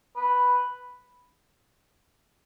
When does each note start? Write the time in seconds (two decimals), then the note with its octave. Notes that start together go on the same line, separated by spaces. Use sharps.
0.17 B4